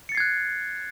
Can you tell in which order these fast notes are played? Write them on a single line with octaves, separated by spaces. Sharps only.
C#7 A6 C7 G#6 F#6